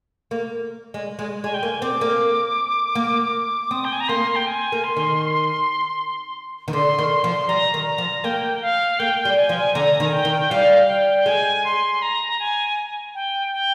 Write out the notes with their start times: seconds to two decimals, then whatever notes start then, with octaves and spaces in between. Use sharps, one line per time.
0.31 A#3
0.94 G#3
1.19 G#3
1.44 G#3 G#5
1.54 G5
1.63 A#3 G#5
1.82 C4 D6
2.01 A#3
2.95 A#3
3.71 C4 D#6
3.85 G5
3.92 G#5
4.00 A#5
4.09 A#3 C6
4.36 G5
4.47 G#5
4.72 A#3
4.84 C6
4.97 D#3
6.68 D#3
6.73 D3 C6
6.98 D#3
7.10 C6
7.24 F3
7.48 G3 A#5
7.74 D#3
7.86 A#5
7.98 F3
8.24 A#3 G5
8.62 F5
8.99 A#3 G5
9.25 G3
9.38 G#5
9.49 F3
9.75 D3 A#5
10.00 D#3
10.06 G#5
10.12 G5
10.25 D#3
10.51 G3 F5
10.88 G5
11.26 G#3 G#5
11.64 C6
12.02 A#5
12.39 G#5
13.15 G5
13.52 G5